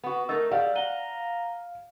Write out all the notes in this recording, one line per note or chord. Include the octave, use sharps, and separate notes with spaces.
B3 F#4 F#5
A3 D#4 A#4 E6 A6
G3 G#4 F5
F#5 A#5 D#7 G7